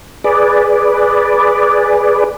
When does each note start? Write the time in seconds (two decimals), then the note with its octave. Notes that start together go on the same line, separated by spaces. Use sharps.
0.24 G#4 B4 D5